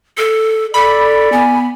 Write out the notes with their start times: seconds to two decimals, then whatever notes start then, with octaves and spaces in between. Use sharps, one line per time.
0.18 A4
0.74 A4 D5 B5
1.32 B3 G#5